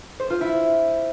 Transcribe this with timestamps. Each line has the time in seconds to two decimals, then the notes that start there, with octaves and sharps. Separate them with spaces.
0.20 C5
0.30 F4
0.41 E4